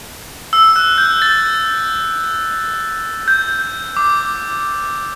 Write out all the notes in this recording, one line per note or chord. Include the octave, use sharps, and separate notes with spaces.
E6
F#6
G6
A6
G6
D6